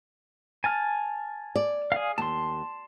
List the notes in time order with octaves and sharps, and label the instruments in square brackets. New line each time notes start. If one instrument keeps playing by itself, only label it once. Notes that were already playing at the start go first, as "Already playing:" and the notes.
[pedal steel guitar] G#5 A5 F6
[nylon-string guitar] D5
[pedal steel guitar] G#4 F5
[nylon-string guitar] D#2 [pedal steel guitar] A5 C6